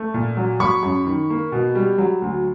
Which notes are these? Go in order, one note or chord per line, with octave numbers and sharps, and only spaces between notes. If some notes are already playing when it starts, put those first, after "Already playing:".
Already playing: A3
A#2
F#3
F#3 B5 C#6
F#2
D#3
A#3
B2
G3
F#3
D2